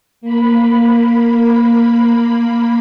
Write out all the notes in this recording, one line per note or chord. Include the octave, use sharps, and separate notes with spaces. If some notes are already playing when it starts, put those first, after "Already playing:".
A#3 B5